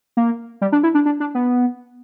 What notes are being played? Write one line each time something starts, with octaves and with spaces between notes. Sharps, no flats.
A#3
G3
D4
E4
D4
D4
D4
B3